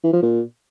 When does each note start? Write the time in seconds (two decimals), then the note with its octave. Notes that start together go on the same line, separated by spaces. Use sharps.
0.04 E3
0.13 F3
0.23 A#2